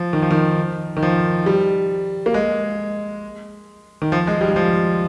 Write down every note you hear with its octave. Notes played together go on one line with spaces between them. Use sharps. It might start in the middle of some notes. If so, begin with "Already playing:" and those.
Already playing: F3
D#3
F3
D#3
D#3
F3
G3
A#3
G#3
D#3
F3
G#3
G3
G3
F3